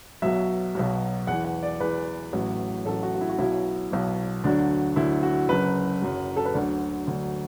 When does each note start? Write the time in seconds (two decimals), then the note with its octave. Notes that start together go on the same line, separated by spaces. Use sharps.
0.22 B1 B2 F#3 E5
0.75 B1 B2 F#3
1.27 E2 E3 F#5
1.44 F#5
1.63 D5
1.80 E2 E3 B4
2.33 A1 A2 F#3
2.85 A1 A2 F#3 A4
3.03 F#4
3.15 F#4
3.21 E4
3.30 F#4
3.39 B1 B2 F#3 E4
3.92 B1 B2 F#3
4.44 D2 D3 F#3 D4
4.96 D2 D3 F#3 E4
5.23 F#4
5.49 F#1 F#2 F#3 B4
6.02 F#1 F#2 F#3
6.37 A4
6.45 B4
6.54 D2 D3 F#3 D5
7.07 D2 D3 F#3